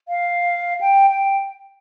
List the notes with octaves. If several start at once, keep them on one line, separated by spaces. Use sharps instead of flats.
F5
G5
G5